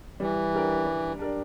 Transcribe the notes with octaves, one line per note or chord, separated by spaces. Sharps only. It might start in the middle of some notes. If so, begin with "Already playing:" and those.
E3 G3
D4 G4 A#4 D5
G3
D4 G4 A#4 D5